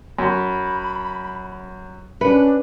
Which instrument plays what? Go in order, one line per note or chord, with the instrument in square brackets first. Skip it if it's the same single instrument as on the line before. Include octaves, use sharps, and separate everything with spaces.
[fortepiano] F#2 [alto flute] B5
[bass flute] C#4 [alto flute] D4 [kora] B4 F#5